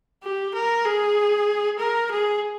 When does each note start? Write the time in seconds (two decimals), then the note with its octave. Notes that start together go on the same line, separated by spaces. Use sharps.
0.23 G4
0.54 A#4
0.85 G#4
1.79 A#4
2.11 G#4